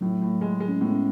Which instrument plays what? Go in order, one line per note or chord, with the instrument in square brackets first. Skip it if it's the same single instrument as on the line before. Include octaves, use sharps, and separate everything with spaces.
[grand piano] A2 [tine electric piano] F#3 A3
[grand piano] A2
G#3
G#3
[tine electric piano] C#4
[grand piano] A2 [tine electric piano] G#3 B3
[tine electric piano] C#4